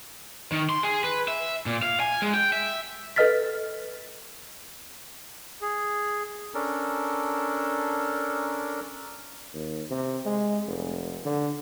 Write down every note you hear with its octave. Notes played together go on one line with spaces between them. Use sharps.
D#3
C6
G#4
B4
E5
A#2
F5
G#5
G#3
G5
E5
A4 B4 D#5 F6 A6 B6
G#4
C#4 D4 A4 A#4
D#2
C3
G#3
F1
D3